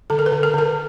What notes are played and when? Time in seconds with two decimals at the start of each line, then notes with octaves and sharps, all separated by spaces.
0.10 D3 A4
0.19 A#4
0.26 B4
0.32 D3
0.43 A#4
0.54 D3 A#4